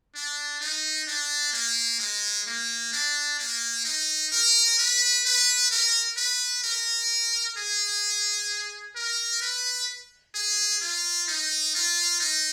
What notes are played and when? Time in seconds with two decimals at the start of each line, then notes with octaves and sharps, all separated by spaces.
0.15 D4
0.61 D#4
1.08 D4
1.53 A#3
2.00 G#3
2.47 A#3
2.93 D4
3.39 A#3
3.85 D#4
4.32 A#4
4.79 B4
5.26 B4
5.71 A#4
6.17 B4
6.64 A#4
7.58 G#4
8.96 A#4
9.42 B4
10.35 G#4
10.82 F4
11.28 D#4
11.75 F4
12.20 D#4